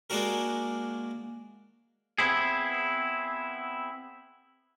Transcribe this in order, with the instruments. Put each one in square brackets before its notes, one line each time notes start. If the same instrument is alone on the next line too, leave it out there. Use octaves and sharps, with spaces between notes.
[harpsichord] G#3 A#3 D4 F#4 A#4
[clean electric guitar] B3 C4 E4 G#4